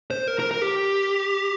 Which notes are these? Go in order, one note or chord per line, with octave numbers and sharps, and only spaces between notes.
C5
A#4
A#4
A#4
G4